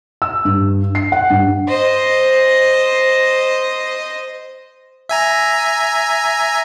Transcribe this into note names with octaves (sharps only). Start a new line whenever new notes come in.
E6
G2
C7
F#5
G2
C5 D#5
E5 G#5 A#5